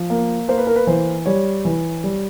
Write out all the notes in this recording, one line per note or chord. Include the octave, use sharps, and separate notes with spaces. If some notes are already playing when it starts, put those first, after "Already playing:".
Already playing: F3
A#3
A#3 C5
B4
A#4
B4
E3 C5
G3 C#5
E3
G3